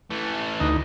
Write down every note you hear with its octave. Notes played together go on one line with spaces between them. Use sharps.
E3 A3
D2 D#4